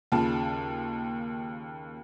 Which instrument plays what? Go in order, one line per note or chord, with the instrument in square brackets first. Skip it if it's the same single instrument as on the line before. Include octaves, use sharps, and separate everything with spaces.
[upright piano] D#2 C#3 F4 A5